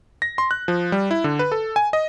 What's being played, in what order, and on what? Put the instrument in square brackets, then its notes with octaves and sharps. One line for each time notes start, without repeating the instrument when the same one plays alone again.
[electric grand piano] A#6
C6
F#6
F3
G3
E4
D3
B4
A4
G#5
D#5